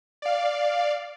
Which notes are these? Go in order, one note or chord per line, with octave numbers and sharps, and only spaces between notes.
D5 F5